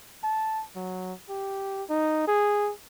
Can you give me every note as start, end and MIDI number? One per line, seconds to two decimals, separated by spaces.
0.24 0.64 81
0.76 1.13 54
1.29 1.83 67
1.90 2.24 63
2.28 2.72 68